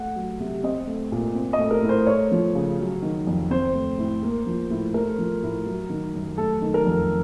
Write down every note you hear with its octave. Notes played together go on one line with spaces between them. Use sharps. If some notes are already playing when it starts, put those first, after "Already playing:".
Already playing: A3 F#5
F#3
C3
C4 D#5
A3
A#2
C4
D#5
A3
A#4
A2
C5
A3 C#5
F3
C#3
F#3
D#3
F2
C4 C5
A3
A2
A#3
F3
A2
A3 A#4
F3
A2
F#3
D#3
F#2
A3 A4
D#3
A#4
F2